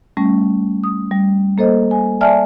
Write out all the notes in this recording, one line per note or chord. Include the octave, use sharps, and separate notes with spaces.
G3 A3 C#4
D#6
G3
A#3 A4 C5 D#5
G#5
D5 E5 G#5 A5 F6